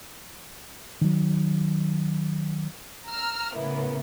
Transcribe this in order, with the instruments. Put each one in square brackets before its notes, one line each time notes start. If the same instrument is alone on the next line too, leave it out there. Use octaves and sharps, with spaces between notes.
[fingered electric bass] D#3 F#3
[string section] A#5 E6 F6
A2 C#3 A#3 B3 E4